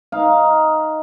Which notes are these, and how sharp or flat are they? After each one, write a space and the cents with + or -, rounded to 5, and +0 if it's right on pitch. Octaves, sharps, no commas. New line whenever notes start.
D#4 +5 F5 +0